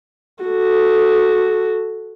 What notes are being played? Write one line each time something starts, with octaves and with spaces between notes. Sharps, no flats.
F#4 A4